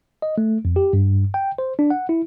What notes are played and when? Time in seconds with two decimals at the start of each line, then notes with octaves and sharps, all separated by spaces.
0.22 D#5
0.38 A3
0.65 F2
0.76 G4
0.93 G2
1.34 G5
1.58 C5
1.79 D4
1.90 F#5
2.09 E4